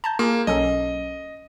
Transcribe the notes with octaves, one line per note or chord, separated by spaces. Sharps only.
A5 A#5 G6
A#3 F4 G#4
B1 C#4 A4 D#5